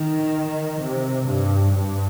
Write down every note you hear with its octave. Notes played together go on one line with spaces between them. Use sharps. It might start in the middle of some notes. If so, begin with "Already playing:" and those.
Already playing: D#3
C3
G2
G2